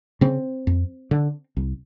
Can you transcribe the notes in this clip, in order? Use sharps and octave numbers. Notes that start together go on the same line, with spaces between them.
C#3 C4
F2
D3
C2